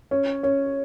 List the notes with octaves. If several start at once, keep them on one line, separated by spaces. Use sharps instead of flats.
C#4
C#4